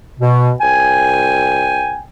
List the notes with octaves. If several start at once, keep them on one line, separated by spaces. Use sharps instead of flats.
B2
C2 G5 G#5